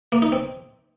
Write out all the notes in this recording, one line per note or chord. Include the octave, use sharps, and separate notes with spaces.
A#3
D#4
C4